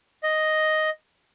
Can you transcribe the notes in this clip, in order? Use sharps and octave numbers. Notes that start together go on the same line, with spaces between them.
D#5